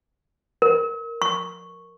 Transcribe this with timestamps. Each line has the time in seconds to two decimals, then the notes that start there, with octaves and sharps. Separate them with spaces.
0.62 A#4
1.22 C#6